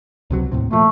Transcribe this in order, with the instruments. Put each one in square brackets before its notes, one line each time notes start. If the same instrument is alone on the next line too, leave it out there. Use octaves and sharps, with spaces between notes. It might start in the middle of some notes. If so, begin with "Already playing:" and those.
[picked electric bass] C#2 C3 F#3
D#2 A2 C3
[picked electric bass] A#2 F3 [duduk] A3